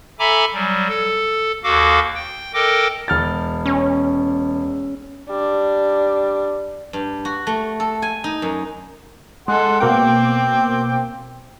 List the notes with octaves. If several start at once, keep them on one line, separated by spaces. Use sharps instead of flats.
A4 E5 G#5 A#5 B5 D6
F#3 G3
A4
D#2 F#4 A4 F5 D6
G5
A4 A#4 D#5 G5 D6
E1 F6 A6
C#4
G3 D4
G2
F#4
A3
A4
G#5
D#4
F#2
G#3 A4 F#5 C6
B2 A#3 C4 G5 D6